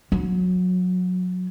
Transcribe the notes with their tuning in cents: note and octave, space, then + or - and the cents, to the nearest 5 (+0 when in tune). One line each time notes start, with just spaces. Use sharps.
F#3 -25